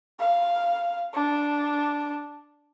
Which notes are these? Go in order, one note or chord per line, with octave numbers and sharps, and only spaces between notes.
F5
D4